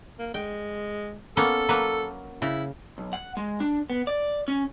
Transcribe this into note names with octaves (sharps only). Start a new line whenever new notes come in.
A#3
G#3 G5
A#3 B3 C#4 A4
F#3 A#3 B4
C#3 E4
B1
F#5
G#3
D4
B3
D5
C#4